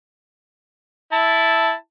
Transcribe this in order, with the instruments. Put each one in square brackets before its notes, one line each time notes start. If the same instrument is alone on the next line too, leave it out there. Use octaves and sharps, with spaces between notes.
[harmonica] E4 A5